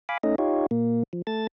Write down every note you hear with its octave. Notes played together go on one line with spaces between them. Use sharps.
F5 G#5 B5 D6
A3 C#4 D#4 D#5
D#4 F4 G4 C#5
A#2 A#3
F3
A3 A5 A6